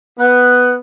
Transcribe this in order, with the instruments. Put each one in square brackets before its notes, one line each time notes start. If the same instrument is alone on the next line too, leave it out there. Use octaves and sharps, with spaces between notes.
[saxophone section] B3 [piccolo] F#6